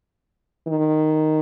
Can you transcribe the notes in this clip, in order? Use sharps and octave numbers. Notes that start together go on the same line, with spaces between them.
D#3